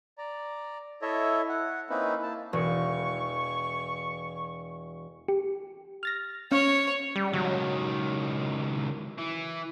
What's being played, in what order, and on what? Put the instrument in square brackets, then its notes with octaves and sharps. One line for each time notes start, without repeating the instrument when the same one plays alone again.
[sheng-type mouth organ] D5 A#5
E4 A4 C#5 D#5 E5
F#5
A#3 C4 C#4 D#4 E4 B4
A#3 A5
[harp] E1 [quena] C#6
[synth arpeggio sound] G4
F6 A6 A#6
[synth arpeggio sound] C#4 F5 C#6 [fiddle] C#5
[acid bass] G3
[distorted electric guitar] C#2 D#3 [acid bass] F#3
[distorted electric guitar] E3